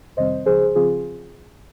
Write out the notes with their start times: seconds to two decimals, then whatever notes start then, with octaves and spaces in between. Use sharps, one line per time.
0.17 F2 C3 D#3 G3 C4 C5 D#5
0.46 C#2 C#3 F3 G#4 C5
0.75 C#3 F3 C4 F4 G#4